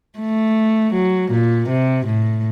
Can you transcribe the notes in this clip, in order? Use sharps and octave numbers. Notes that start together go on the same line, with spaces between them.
A3
F#3
A#2
C3
A2